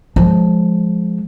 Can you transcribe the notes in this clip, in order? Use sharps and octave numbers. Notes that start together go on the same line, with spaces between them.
F3 G#3